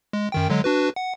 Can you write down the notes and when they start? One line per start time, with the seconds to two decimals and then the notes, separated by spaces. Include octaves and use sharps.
0.13 G#3
0.32 F#2 D#3 G5
0.50 D3 F#3 G#3
0.64 D4 F#4 B4
0.96 F#5